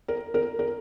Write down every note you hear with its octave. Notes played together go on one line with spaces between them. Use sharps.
A#4
A#4
A#4